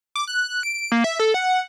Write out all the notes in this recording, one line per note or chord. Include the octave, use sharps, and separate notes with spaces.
D6
F#6
D7
A#3
E5
A4
F#5